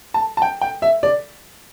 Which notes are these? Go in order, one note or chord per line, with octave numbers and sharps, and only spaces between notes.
A5
A5
G5
G5
E5
D5